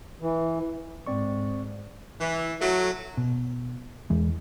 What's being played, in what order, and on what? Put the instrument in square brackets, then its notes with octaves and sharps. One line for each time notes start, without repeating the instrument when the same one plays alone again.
[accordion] E3
[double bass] G#2 [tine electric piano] C4 D5 C#6
[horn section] E3
F#3 A3
[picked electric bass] B2
E2 E3 G#3